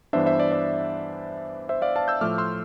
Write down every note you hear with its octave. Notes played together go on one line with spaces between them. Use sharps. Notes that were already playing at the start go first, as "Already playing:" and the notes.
G2 E3 B3 D4 C5 E5
C5 E5
D5
D5
C5 E5
D5 F5
F5 A5
E6 G6
A2 F3 A3 D6 F6
C6 E6